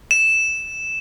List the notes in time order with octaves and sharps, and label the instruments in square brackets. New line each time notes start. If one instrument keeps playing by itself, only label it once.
[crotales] E7